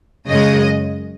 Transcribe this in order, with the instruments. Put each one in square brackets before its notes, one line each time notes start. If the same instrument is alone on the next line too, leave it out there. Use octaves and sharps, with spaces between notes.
[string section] F#2 C#3 G#3 D#5